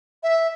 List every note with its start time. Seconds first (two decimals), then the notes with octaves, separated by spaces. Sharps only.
0.23 E5